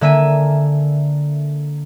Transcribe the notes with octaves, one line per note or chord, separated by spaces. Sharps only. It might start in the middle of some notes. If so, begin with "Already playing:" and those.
D3 A#3 E5 G#5 D#7